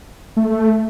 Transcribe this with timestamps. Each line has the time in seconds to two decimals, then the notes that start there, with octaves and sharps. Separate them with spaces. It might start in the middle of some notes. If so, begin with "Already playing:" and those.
0.37 A3